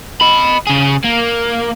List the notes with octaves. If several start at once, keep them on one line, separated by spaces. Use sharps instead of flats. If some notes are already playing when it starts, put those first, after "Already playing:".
D#5 B5
C#3 G#4
A#3